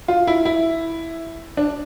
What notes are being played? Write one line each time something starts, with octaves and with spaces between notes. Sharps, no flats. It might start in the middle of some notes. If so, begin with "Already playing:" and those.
F4
E4
E4
D4